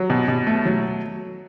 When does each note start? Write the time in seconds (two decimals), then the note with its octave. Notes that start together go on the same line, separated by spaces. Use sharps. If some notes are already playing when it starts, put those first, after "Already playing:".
Already playing: F#3
0.10 B2
0.28 B2
0.47 A3
0.65 F#3